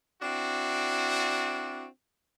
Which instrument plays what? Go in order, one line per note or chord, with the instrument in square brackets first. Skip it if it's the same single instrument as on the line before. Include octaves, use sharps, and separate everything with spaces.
[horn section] C4 D4 E4 F#4